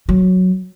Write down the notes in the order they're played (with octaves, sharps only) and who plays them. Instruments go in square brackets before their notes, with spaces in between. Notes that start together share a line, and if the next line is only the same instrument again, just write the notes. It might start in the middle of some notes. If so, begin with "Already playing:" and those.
[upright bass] F#3